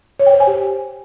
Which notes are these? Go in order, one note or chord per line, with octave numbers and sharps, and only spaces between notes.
C#5
G5
C5
G#5
G4